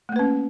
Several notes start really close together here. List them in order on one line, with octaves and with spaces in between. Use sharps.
A3 A#3 B4 C#4